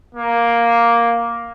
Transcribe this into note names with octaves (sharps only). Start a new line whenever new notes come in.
A#3